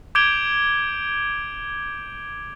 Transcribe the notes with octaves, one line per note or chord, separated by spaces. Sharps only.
D6 G6 G#6 D7 F7 G7